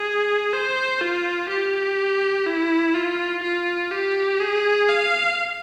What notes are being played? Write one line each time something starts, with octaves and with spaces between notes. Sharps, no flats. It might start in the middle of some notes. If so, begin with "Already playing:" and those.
Already playing: G#4
C5
F4
G4
E4
F4
F4
G4
G#4
F5